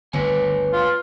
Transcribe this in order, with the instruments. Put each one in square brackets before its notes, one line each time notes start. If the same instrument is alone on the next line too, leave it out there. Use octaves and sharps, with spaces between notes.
[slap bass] G1 D2 [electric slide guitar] B4 C#5 G#5
[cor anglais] F4